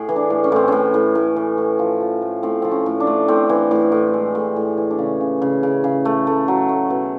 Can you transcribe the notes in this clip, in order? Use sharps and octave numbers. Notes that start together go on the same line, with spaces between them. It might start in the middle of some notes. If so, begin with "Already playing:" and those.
Already playing: A2 G#4
E3
D4
A2
C#4
A2 C4
A2 C#4
A2
A2
E3
A2
F3
F3
A2
A2 C4
F3 C4
C#4
A2
D4
A3
A2 C4
E3
A2
A2
G#3
A2
A2
E3
D4
C#3 C#4
C#3
C#3
C#3
C#3
A3
A3
F#3
A3
B2